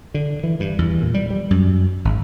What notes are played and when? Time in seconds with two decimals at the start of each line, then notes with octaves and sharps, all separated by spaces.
0.14 D3
0.43 E3
0.60 G2
0.79 E2
1.02 A#2
1.14 G3
1.30 G3
1.51 F#2
2.05 G#1